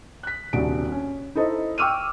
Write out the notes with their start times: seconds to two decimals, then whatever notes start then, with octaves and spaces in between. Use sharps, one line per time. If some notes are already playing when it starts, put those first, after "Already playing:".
0.23 F#6 B6
0.53 D#1 C2 D4 F#4 D7
0.92 C#4
1.35 D#4 E4 A4 C5 D#5
1.78 G5 C#6 D6 E6 F6 D#7